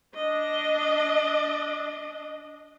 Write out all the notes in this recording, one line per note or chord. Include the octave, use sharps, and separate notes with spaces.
D4 D#5